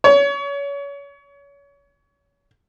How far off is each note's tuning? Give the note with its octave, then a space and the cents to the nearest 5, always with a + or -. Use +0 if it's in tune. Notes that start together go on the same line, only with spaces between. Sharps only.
C#5 +30